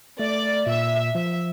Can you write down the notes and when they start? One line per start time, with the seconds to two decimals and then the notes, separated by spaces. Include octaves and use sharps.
0.19 A3 D5
0.66 A#2 E5
1.14 F3 E5